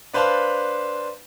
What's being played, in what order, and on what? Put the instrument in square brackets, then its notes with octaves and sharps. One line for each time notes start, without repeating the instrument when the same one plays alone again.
[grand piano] D4 B4 C5 F5 A5 B5